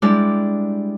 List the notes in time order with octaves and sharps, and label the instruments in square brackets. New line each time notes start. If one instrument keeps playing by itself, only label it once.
[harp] G3 G#3 D4 E4 G4 D5